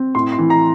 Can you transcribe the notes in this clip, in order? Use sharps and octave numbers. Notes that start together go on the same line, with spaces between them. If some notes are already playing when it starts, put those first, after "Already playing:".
Already playing: C4
A2 C6
C6
E3
A#5